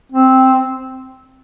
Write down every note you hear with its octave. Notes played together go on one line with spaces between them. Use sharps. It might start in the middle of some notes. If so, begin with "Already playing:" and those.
C4